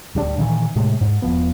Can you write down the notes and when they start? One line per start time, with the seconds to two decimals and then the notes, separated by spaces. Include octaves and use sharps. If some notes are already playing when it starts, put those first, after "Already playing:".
0.15 D1 G3 D4
0.38 A#2 D#3 E3
0.76 A2 C3 G#3
1.01 G#2
1.22 E1 C#2 F3 B3